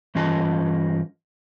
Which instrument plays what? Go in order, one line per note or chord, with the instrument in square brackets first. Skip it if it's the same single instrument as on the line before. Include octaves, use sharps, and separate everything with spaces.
[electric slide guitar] G2 E3 C#4 F4 D#5 A5